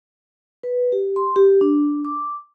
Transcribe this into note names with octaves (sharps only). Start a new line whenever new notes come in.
B4
G4
C6
G4
D4
D6